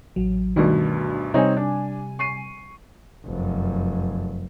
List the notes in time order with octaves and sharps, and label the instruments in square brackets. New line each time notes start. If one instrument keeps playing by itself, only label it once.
[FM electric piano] A1 F#3
[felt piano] D2 G2 B2 [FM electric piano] D#3 D4
[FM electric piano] C3 G3 G#5 [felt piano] C4 D#4 C#5
[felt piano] D4
C#6 C7 D#7
[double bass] F1 F#2